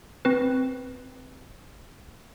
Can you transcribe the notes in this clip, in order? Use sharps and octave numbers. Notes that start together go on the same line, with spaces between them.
C4 B4